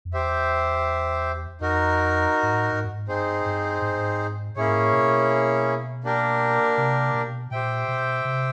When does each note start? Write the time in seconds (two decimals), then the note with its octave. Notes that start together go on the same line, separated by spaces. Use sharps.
0.05 F2
0.13 E2 G4 C5 E5
1.61 F2 D#4 F#4 A#4
2.43 G#2
2.53 A2
2.72 G#2
2.84 G2
2.91 G#2
3.08 G2 C4 D#4 G#4 C5
3.46 G2
3.82 G#2
3.90 G2
3.98 G#2
4.56 A2 A#3 C#4 E4 G#4 C#5
4.67 G#2
4.77 A2
4.93 B2
6.04 A#3 D4 G4 A#4
6.77 C3
7.14 B2
7.51 A#2 G4 C5 E5 G5
7.88 B2
8.25 C3